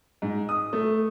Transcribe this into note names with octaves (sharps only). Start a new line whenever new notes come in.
G#2
D#6
A3